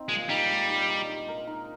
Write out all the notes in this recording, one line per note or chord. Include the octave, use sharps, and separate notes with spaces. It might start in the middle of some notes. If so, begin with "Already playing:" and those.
Already playing: C4 D#4
A#2 G#3
G3 D#4
G#3
D#4
D#4
D#4
A#4
D#4